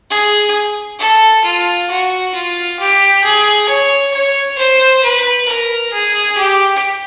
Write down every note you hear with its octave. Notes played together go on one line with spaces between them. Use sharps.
G#4
A4
F4
F#4
F4
G4
G#4
C#5
C#5
C5
B4
A#4
G#4
G4